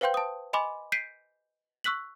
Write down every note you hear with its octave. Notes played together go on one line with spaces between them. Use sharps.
B4 C5 F5 G5 C6 G6
A5 D#6
D#5 G#5 B5 C6 D6
G6 B6 C7 D7 D#7
C#6 E6 F#6 B6 F#7